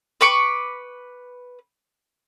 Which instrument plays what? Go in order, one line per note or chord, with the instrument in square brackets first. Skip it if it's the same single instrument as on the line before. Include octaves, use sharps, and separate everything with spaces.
[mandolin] B4 B5 C#6 D6